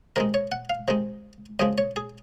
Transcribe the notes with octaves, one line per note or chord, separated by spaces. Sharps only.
C3 D#3 G#3 A#4
C#5
F#5
F5
C3 D#3 G#3
F#2 C#3 F3 G#3 D#5
C#5
G#4